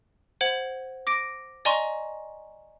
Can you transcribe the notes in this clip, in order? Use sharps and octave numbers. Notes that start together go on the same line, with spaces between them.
C5 F#5 G#6 F#7
D6 A#6 D7
D5 D#5 G#5 A#5 C6 C#6